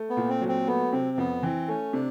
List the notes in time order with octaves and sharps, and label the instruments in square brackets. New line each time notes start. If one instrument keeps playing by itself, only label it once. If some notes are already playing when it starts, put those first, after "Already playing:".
Already playing: [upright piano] A3
[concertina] B3
[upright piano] A#2
[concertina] C4
[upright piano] F#3
[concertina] C4
[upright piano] A3 [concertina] B3
[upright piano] C3 [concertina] C4
[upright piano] F2 [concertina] B3
[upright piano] E3 [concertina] C4
[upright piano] A3 [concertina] C#4
[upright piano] C3 [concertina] D4